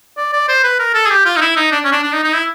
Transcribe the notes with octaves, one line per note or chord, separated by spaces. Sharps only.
D5
D5
C5
B4
A#4
A4
G#4
G4
F4
D#4
E4
D#4
D4
C#4
D4
D4
D#4
D#4
E4